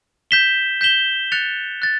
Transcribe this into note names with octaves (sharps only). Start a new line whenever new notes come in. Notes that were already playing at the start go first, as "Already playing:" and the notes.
G6 B6 E7 G7
G6 B6 E7 G7
F#6 A6 C#7 F7
F#6 A6